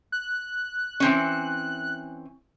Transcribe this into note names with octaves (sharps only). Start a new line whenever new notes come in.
F#6
E3 C4 C#4